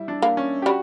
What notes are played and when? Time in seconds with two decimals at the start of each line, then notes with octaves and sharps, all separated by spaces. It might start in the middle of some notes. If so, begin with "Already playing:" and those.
Already playing: G3 E4
0.08 D4
0.22 A#3
0.37 C#4
0.62 G4
0.66 G3 F#4